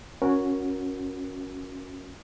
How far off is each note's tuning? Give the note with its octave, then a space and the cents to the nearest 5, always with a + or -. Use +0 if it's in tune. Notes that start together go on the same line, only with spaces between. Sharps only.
C#4 +0 F#4 -15 A#4 +10